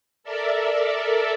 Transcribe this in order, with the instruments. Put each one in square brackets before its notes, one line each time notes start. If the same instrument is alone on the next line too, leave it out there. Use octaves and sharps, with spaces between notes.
[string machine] A4 A#4 D5 E5